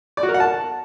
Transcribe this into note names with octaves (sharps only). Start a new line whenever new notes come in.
D5
F#4
A#4
F#5
A5